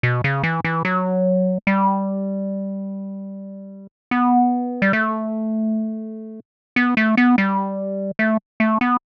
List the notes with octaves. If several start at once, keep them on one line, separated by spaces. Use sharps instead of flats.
B2
C#3
E3
E3
F#3
G3
B3
G3
A3
B3
A3
B3
G3
A3
A3
B3